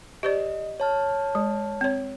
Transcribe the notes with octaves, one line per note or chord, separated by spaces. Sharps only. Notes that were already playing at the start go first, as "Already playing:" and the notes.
G4 C5 D5 D#5
C#5 A5 F6
G#3
C4 C#5